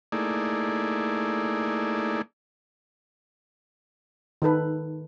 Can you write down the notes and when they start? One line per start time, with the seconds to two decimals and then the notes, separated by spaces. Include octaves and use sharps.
0.12 A3 A#3 D#4 E4 G#4 D5
4.42 D#3 D#4 A4 B4